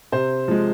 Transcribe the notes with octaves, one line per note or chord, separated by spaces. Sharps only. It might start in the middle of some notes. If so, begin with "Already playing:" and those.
C3 C5
F3 G#3